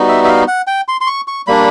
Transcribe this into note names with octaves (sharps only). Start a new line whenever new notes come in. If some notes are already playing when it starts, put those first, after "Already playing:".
Already playing: G3 B3 D#4 F#4
E5
E5
F5
F#5
G5
C6
C6
C#6
C#6
G3 A#3 D4 B5